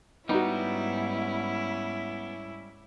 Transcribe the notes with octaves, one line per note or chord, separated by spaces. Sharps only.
G#2 G3 B3 C#4 D#4 E4 F#4